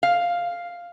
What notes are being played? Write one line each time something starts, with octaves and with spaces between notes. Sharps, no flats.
F5